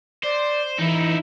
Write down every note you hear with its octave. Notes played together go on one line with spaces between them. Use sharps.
C5 D5
E3 D#4 E4